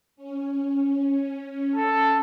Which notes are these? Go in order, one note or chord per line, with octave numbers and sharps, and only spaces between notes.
C#4
A4